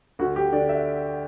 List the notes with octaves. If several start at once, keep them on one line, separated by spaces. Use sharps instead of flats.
D2 F#4
G4
D3 D5
E5